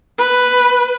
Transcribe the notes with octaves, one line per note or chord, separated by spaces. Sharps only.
B4